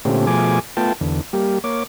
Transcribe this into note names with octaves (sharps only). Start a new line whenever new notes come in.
A#2 D3 A3 C4 C#4 G4
B2 F3 A3 G#4 G#5 D6
A3 B3 F4 G5 A5
E2 D3
G3 A#3 G4
A#3 C#5 D6